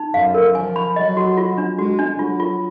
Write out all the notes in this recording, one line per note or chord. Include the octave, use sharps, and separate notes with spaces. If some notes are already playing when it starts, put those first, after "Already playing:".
Already playing: D#4
F#2 F5
A#4
F3 G#5
B5
F#3 D#5
F#4
F4
D4
G#3 F#4
D4
F#3 F4
F4